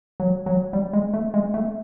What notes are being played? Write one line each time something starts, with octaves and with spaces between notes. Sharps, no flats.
F#3
F#3
G3
G#3
A3
G#3
A3